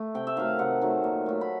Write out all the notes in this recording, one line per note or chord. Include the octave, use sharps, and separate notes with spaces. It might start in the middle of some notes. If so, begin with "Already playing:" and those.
Already playing: A3
C3 G5
E5
D#3 F#3 A3 F5
C3 F#5
D#3 F#3 A3
A#2
F#3 A3
B5